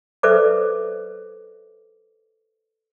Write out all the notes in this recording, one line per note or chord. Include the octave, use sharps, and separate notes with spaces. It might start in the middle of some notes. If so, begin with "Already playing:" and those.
A4 B4 C5 D5 E5 D6